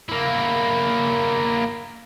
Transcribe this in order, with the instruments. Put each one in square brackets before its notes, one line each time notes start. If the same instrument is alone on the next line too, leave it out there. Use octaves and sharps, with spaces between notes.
[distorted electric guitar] A#3 E4